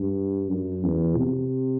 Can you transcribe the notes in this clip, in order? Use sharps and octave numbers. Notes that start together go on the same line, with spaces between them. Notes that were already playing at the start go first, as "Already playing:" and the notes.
Already playing: G2
F#2
E2
C3